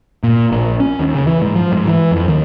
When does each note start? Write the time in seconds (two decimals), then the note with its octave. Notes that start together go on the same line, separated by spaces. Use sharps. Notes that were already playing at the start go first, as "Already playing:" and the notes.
0.23 A#2
0.52 A#1
0.80 C#4
0.99 D#2
1.14 C#3
1.27 E3
1.42 G#2
1.56 F3
1.72 G#2
1.87 E3
2.11 F2
2.28 D#2